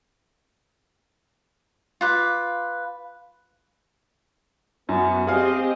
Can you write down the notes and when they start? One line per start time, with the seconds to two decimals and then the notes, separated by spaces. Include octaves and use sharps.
2.01 F4 B4 D6
4.89 F#2 B3 F#4
5.27 C4 G4 G#4 D#5 F5